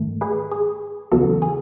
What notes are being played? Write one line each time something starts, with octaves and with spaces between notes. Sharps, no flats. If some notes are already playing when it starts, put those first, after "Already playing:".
Already playing: G#2 D#3 A3
G#4 B4
G#4
E2 C#3 F#3 B3 F#4 A4
G#4